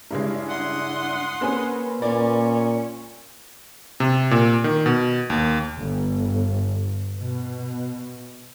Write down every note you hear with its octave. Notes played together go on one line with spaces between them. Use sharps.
G2 C#3 G#3 D4 E4
F#5 C6 D#6
A#3 C4 C#4 G#4 B4
A#2 C#4 D5
C3
A#2
D#3
B2
D#2
G1
B2